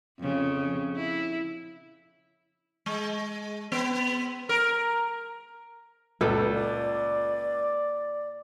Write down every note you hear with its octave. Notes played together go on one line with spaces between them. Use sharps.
F2 C#3
E4
G#3
B3
A#4
C#2 A#2 A4 B4
D5